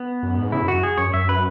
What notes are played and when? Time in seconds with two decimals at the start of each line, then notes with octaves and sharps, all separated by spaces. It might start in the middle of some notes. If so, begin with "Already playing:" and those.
Already playing: B3
0.23 F#2
0.38 G#2
0.52 C#3 E4
0.62 F#2
0.68 F#4
0.74 F#2
0.83 G#4
0.98 F#2 C#5
1.14 F#2 E5
1.29 B4